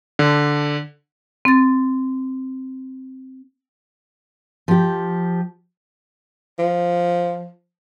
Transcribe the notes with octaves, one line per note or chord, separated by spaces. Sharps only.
D3
C4 A6
F3 G4
F3